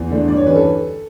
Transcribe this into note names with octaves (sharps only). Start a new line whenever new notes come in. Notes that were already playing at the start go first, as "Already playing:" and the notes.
Already playing: E2
D3 A3 D4
G2 D5
C#5
E3 G3 C#4 B4
A4